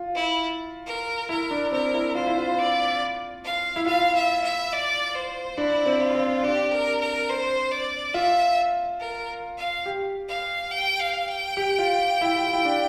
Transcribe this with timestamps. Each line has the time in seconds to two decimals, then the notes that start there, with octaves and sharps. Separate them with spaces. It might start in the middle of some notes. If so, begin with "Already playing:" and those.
Already playing: F4
0.15 E4
0.86 A#4
1.29 E4 A#4
1.51 D4
1.72 C4 A#4
1.94 E4
2.15 F4 C5
2.27 E4
2.38 F4
2.58 D5
3.44 F5
3.76 E4
3.86 F4 F5
4.15 E5
4.43 E5
4.73 D5
5.14 C5
5.57 D4 E4
5.86 C4
6.01 F4
6.15 C4
6.43 D4 G4
6.71 A#4
7.00 A#4
7.29 C5
7.72 D5
8.14 F4 E5
9.00 A#4
9.57 F5
9.86 G4
10.29 F5
10.71 G5
11.00 F5
11.28 G5
11.57 G4
11.79 F4
12.21 E4
12.43 F4
12.53 E4
12.65 D4